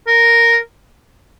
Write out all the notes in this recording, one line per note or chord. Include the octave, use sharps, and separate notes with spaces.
A#4